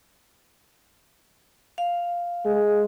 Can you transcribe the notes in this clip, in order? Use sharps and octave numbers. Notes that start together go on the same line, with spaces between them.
F5
G#3